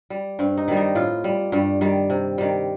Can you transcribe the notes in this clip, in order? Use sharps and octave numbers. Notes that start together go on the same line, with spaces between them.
G3
G2 C4
D#4
D#3 G3
D#4
A2 F4
G3
G2 G3
D#3 G3
C3
D#3 G3